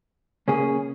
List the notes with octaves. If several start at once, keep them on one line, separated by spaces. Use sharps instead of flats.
C#3 A#3 C#4 G#4